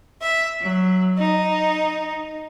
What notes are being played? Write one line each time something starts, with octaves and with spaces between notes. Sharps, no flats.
E5
F#3
D#4